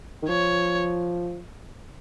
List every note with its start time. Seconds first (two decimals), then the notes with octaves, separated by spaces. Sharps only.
0.23 D#3
0.29 F3 C#5